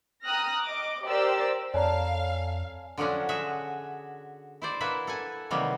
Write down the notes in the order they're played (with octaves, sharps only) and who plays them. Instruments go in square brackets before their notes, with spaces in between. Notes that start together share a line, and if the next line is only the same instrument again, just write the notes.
[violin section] G5 A#5 D#6 F6 F#6 A#6
D#5 D6
G4 A#4 C5 D5 E6
[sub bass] F2 [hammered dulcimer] A4 G#5 B5 [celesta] C#5 D5 A#5 [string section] F5
[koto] D3 F3 F#3 C#4 D4
F#4 G#4 E5
E4 C5 D5
A#3 E4 B4 E5 F#5
A4 F#5 G#5
C3 D#3 E3 F#3 G3 A#3